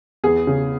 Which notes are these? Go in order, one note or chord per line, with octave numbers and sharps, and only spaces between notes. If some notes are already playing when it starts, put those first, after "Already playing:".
E2 G#4
C#3